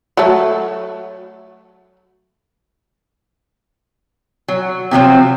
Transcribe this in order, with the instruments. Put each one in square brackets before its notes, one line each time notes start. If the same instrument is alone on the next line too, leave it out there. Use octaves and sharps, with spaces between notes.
[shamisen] F#3 A3
[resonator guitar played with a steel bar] F#3
C3 F3 F#3 C4